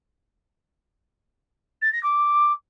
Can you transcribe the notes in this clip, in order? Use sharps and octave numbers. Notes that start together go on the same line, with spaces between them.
A6
A#6
D6